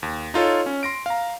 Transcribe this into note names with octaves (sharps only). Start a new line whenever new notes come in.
D#2
D#4 F4 A4 C#5
C#4
C6 A#6 D7
F5 A#5